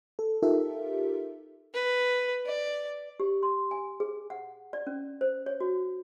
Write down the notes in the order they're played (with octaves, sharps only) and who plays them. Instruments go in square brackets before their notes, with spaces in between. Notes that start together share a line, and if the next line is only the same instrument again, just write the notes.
[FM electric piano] A4
D#4 F4 G4 A4 A#4 E5
[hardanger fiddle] B4
D5
[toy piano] G4
C6
G#5
G#4
F#5
D5
C#4
C5
C#5
F#4